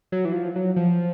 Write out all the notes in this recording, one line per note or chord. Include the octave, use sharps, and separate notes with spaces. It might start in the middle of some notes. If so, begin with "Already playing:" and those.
F#3
E3
F3
F#3
F3